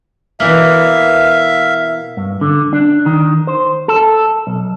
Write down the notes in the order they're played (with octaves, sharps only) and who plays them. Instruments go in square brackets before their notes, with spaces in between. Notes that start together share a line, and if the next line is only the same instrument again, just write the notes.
[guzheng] B2 E3 A#3 [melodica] E5 F5
[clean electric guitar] G2
D3
D4
D#3
C5
A4
B1